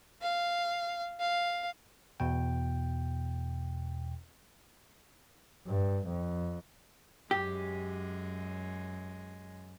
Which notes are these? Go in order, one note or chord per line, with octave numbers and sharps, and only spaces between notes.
F5
F5
E2 B2 G5
G2
F2
F#2 G#3 G4